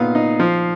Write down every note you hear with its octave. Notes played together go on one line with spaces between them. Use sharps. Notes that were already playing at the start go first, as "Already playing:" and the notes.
Already playing: A#2 B3 D#4 F5
D#4
F3